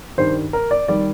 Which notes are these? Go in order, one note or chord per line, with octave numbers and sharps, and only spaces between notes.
G2 D#3 G3 C5
A#4
D5
D#3 G3 D5